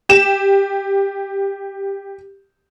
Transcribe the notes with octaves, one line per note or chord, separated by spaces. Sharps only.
G4 E7